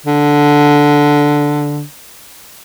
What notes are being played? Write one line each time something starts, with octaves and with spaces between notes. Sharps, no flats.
D3